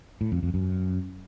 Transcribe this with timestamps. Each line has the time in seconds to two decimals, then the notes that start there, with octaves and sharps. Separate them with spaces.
0.21 A2
0.32 F2
0.43 F2
0.54 F#2